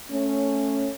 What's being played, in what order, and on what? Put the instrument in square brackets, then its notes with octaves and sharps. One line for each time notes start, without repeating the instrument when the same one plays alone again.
[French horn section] A3 C#4